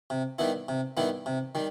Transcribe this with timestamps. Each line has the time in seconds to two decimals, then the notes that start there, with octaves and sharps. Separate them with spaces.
0.10 C3
0.39 D#3 G3 B3 E4
0.68 C3
0.97 D#3 G3 B3 E4
1.26 C3
1.55 D#3 G3